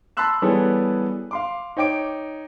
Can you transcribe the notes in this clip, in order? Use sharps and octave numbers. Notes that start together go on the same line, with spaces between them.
A5 B5 C6 E6 F#6 E7
E3 G3 B3 G#4 A4 C#5
F5 C6 D6
D#4 C#5 G5 D6 D7